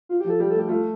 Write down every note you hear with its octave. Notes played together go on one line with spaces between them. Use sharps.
F4
G4
F3
A4
G3 G4
A4
A3 G4
A3 F4